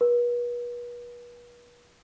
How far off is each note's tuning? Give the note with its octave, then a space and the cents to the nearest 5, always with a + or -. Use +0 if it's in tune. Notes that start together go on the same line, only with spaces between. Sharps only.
B4 -40